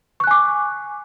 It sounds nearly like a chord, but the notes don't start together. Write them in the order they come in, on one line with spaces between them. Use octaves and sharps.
C#6 F#6 G#5 D6